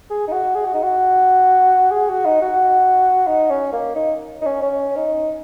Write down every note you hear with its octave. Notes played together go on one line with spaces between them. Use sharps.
G#4
D#4
F#4
G#4
F#4
D#4
F#4
G#4
F#4
D#4
F#4
D#4
C#4
A#3
D#4
D#4
C#4
C#4
D#4